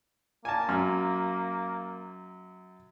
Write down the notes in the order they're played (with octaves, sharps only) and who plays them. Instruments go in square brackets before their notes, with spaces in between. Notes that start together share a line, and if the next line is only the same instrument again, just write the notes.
[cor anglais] A#3 [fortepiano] G#5 A5
[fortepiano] F#2 F6